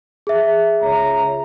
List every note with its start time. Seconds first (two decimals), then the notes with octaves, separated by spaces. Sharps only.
0.27 G#4 E5
0.82 C#2 C#5 A#5